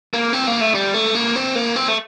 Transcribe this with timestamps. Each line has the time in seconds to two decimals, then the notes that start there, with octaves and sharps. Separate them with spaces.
0.14 A#3
0.33 C4
0.47 A#3
0.61 A3
0.75 G3
0.94 A3
1.15 A#3
1.36 C4
1.55 A#3
1.76 C4
1.88 A3